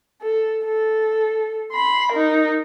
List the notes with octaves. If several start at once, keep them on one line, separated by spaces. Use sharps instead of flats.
A4
A4
B5 C6
D#4 A#4